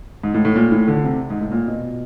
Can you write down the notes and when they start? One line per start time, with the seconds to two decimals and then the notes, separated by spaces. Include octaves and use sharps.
0.24 G#2
0.34 A2
0.45 A2
0.56 A#2
0.72 A2
0.88 D3
1.04 C3
1.30 G#2
1.41 A2
1.52 A#2
1.68 B2